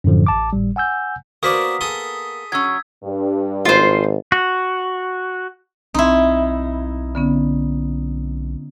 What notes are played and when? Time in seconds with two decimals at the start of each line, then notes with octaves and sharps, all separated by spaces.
0.04 F#2 A2 D3 F3
0.27 A1 A5 D6
0.53 G#1 A2 G3
0.76 F#5 G#5 E6 G6
1.43 A#3 B3 F#4 A#4 C5 D5 D#6 B6
1.81 G#4 A4 C6
2.52 F#3 C#4 E6 G#6
3.04 G2
3.65 G#1 F4 C5
4.32 F#4
5.94 B1 C4 D#4 E4 C6
7.15 D3 B3 C#4